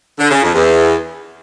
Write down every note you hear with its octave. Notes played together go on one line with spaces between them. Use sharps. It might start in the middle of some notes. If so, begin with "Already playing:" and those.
D3
C#3
F2
E2